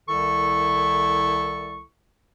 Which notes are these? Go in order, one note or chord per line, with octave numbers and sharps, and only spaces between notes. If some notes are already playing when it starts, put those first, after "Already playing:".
C2 D#3 E4 A4 C#6